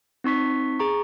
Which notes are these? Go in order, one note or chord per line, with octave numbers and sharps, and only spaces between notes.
C4 D#4 C#6 B6
G#4 A#5 C#6